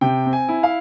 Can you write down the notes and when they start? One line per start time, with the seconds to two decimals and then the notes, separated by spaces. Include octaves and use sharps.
0.01 C3 G5
0.25 C4
0.33 G#5
0.49 E4
0.63 F5